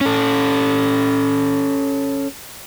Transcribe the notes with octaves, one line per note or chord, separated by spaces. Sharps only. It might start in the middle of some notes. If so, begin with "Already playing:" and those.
C#4 A4